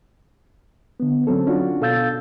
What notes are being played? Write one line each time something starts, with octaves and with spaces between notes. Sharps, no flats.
D3 B3
D3 F#3 C4 C#4 A4
C#4 D4 F4 F#4
B2 A4 F5 E6 G6 A6